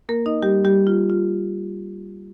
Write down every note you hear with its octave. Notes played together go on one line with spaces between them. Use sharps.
A#3 A#4
D#4 D#5
G3 G4
G3 G4
F4
F4